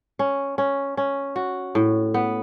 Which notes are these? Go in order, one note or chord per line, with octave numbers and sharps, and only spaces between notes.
C#4
C#4
C#4
F#4
A2
B3